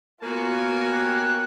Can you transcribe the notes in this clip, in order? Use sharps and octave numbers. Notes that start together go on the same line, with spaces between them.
A#3 B3 F4 F#4 A#4 C#5 G#5
G4 F#6